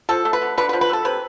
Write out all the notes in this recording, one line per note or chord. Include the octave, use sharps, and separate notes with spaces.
F3 A4
A3
B4
D3
D3 B4
B4
F3
B4
A3 A4
C3 B4